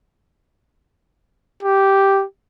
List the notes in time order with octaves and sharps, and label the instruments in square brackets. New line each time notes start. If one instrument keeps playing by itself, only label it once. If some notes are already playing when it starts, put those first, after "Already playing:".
[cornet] G4